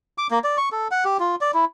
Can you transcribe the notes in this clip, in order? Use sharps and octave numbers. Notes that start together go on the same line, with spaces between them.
D6
A#3
D5
C#6
A4
F#5
G4
F4
D5
E4